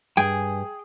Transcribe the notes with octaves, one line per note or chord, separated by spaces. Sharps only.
G2 G#4 G5